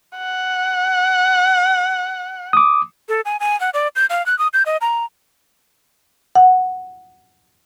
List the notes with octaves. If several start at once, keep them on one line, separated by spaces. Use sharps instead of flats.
F#5
D6 D#6
A4
G#5
G#5
F#5
D5
G6
F5
F#6
D#6
G6
D#5
A#5
F#5